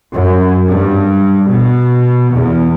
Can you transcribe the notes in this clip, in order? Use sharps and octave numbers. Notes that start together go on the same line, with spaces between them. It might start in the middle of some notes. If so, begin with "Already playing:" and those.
F#2
G2
B2
E2